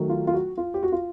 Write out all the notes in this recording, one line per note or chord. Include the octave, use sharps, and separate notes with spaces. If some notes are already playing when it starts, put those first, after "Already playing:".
Already playing: D#3 F#3 A3
F4
F4
F#4
F4
G4
F#4
F4